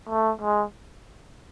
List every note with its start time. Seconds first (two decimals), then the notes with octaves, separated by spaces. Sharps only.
0.09 A3
0.41 G#3